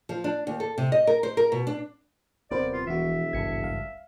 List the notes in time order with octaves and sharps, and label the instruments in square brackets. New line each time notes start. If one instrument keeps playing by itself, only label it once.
[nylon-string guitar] F3
D4
D#2
A4
C3
D#5
A#4
C5
A#4
B2
D4
[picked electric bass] D#1 B3 [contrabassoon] C3 [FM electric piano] A#4 C5 [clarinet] D5
[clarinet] F4
[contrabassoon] E1 [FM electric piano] E3 F3 F#4 [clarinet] E5
[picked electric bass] G#1 C#2 G2 [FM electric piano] G#6 C#7
[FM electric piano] F5